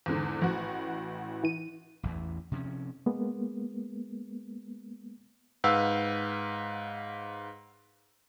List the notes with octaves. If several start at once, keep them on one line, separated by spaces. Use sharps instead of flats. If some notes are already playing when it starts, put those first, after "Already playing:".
E2 G#2 D3
A1 A2 F3 F#4
E3 D#7
A1 E2 E3
C3 F3 C4 C#4
G#3 A#3 B3
G#2 B4 F5 F#5 E6